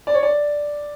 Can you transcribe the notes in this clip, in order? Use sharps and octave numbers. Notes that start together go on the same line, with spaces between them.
D5
C#5
D5